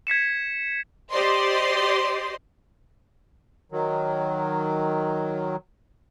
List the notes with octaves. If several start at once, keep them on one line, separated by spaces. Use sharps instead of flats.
G#6 B6 C#7 E7
G4 C5 D5 D#5 C6
D#3 F#3